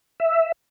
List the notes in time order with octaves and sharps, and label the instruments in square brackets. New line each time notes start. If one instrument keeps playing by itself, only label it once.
[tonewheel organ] E5